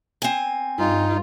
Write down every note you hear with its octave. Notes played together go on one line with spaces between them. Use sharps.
C4 G#5
G2 D#4 F4